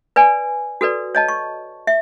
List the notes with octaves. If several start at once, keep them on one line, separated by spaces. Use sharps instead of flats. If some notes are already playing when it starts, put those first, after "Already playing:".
B4 D5 G#5
F#4 A4 B4 D5
C#5 D#5 A5
C#6
E5